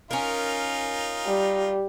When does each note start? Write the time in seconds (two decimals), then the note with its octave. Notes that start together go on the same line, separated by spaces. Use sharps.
0.11 C#4 D#4 F4 A#4
1.26 G3